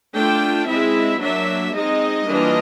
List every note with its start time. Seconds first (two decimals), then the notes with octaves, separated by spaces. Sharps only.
0.14 A3 D4 F4 G5
0.67 G#3 C4 E4 E5
1.21 F#3 A#3 D4 E5
1.74 G#3 C4 D#4 D#5
2.28 E3 G3 A#3 D4 F4